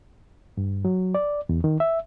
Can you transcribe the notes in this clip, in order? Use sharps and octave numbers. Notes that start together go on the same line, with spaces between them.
G2
F#3
D5
E2
D#3
E5